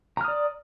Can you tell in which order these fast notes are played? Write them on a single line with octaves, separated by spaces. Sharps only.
A#5 F6 D#6 D5